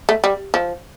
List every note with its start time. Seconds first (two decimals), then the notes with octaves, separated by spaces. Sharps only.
0.09 A3
0.24 G3
0.54 F3